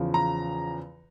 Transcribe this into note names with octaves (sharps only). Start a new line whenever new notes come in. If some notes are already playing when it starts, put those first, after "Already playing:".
Already playing: E2 C#3 F3
A#5